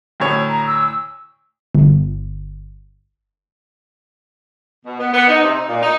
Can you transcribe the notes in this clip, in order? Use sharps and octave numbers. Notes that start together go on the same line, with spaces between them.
D2 A2 C#5
A#5
E6
G1
B2
B3
B3
D#4
C3
D#4
A#2
D#4